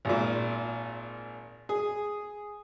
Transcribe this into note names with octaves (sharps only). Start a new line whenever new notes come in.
G#1 A#2
G#4